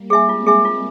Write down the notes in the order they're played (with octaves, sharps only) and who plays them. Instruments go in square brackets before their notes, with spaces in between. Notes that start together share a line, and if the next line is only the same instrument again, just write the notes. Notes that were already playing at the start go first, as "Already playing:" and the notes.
Already playing: [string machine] G3 A#3
[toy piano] G#4 E5 G#5
[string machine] G#3 C4 [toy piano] F4
[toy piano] G#4 E5 G#5
F4